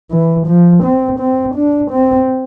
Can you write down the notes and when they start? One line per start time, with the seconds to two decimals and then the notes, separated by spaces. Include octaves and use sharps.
0.12 E3
0.48 F3
0.84 C4
1.20 C4
1.56 D4
1.92 C4